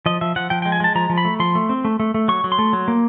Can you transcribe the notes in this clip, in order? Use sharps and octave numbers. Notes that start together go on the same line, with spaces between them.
F3 D#5
F3 E5
F3 F#5
F3 G5
G5
G#3
G#5
G#3 A5
F3 A#5
F3
B5
A3
F3 C6
A3
C4
A3
A3
A3
F#3 C#6
F#3
C6
A3
F#3
A#3